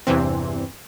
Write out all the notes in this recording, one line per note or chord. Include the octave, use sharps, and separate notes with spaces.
E2 G2 C3 E3 C4